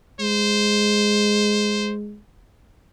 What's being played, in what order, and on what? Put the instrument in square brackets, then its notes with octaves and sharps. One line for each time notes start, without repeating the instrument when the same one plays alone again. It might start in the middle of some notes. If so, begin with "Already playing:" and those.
[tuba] G#3 [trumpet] C5